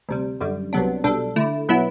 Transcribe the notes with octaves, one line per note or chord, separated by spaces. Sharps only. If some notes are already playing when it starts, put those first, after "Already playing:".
D2 C3 G3
F#2 D3 G3
C2 C3 F#3 B3 D4
B1 B2 G3 D4 A4
D3 A3 E4
B2 F#3 B3 E4